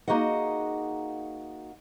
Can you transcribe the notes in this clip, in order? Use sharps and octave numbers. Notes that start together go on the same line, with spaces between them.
A#3 D#4 F#4 G#4 D#5 F#5